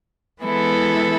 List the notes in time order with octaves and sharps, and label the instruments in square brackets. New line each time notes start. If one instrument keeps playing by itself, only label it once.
[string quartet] E3 G#3 B3 E4 A4